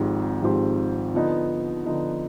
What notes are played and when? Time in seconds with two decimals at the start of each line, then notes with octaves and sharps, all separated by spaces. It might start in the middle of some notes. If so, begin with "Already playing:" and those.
Already playing: G#1 G#2 F3 C4 G4
0.42 G#1 G#2 F3 C4 G4
1.14 D3 F3 B3 D#4
1.86 D3 F3 B3 D#4